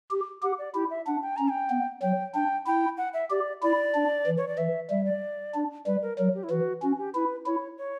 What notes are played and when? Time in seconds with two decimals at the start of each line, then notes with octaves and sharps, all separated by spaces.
0.11 G4
0.42 G4 F#5
0.59 D5
0.74 E4 G4
0.90 E5
1.06 D4 F#5
1.22 G5
1.36 C#4 A#5
1.50 G5
1.70 B3
2.02 F#3 G5
2.34 D4 G5
2.66 E4 G5
2.98 F#5
3.14 E5
3.30 G4 D5
3.62 E4 D5
3.94 D4
4.26 E3
4.38 C#5
4.48 D5
4.58 E3 E5
4.90 G3 E5
5.06 D5
5.54 D4
5.86 G3 B4
6.02 A#4
6.18 F#3 A#4
6.35 G4
6.44 E4
6.50 E3 F#4
6.82 C#4 F#4
6.98 G4
7.14 E4 B4
7.45 E4 C#5
7.78 C#5